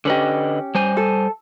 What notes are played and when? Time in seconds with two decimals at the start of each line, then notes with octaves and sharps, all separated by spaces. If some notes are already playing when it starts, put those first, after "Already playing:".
0.05 D3 C#4 G4 B4 D#5
0.75 G3 C5 G#5
0.97 A4